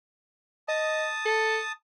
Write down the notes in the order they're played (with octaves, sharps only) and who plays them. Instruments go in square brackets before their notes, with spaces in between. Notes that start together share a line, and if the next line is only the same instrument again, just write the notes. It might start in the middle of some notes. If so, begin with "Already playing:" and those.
[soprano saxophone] D#5 [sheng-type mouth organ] A5 D#6
[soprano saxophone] A4